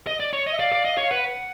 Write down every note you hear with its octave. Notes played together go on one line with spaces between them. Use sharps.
D#5
D5
C#5
D#5
E5
D5 F5
D5
D#5
C#5
F5
B4 F#5